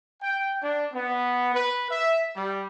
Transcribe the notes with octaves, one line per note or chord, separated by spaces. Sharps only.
G5
D4
B3
B4
E5
G3